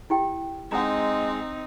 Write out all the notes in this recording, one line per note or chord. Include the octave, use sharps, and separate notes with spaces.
E4 G4 G5
G#3 C4 D#4 F#5 A#5